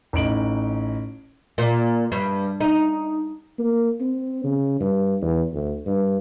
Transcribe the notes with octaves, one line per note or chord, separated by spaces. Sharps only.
A1 D#4 D#5 D7 F#7
A#2
G2
D#4
A#3
C4
C#3
G2
E2
D2
G2